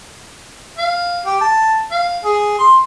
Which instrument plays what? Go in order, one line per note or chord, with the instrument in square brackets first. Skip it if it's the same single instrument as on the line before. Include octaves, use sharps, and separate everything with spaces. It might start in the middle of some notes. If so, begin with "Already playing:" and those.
[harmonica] F5
G4
A5
F5
G#4
C6